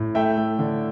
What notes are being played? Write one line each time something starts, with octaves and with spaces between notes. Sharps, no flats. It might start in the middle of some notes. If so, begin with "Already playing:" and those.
Already playing: A2
A3 E5 G5
A3
D3